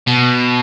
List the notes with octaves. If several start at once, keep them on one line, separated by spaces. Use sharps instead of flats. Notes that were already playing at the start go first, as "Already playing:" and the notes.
B2